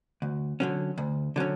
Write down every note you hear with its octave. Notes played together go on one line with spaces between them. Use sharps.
D2
D3 F#3 C#4
D2
D3 F#3 C#4